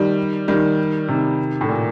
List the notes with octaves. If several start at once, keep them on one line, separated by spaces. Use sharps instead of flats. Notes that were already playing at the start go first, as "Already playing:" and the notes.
Already playing: D#3 G3
D#3 G3
C3 D#3
A2
A#2